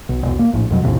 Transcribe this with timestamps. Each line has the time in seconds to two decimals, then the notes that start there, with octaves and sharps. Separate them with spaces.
0.09 B1
0.23 E1 B1
0.39 A#3
0.53 A#1 A2
0.70 F2 B2 F#3
0.84 A#1 D#2 A2 C3